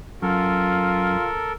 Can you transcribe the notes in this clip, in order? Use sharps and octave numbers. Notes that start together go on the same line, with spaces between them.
F#2 F4 A4 A#4